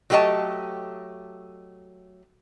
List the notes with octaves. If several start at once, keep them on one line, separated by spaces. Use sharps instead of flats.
F#3 A3 G4 C#5 D#5 A5